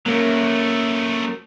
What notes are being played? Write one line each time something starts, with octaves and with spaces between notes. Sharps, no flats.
F#3 A3 A#3 C#4 A#4